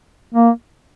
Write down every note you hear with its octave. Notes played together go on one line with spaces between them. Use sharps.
A#3